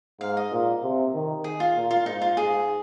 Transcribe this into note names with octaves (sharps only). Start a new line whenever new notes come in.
G#2 F5
D#5
A#2
C3
D#3
G#4
F4
A#2
F4
G#2 D#4
F4
G#2 G#4